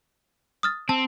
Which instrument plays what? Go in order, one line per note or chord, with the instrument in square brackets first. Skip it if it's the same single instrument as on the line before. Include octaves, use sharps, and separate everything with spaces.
[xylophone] D#6 F6 A6
[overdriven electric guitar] C4 [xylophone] A5